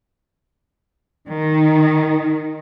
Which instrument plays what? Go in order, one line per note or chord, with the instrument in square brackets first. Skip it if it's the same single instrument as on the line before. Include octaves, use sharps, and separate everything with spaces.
[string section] D#3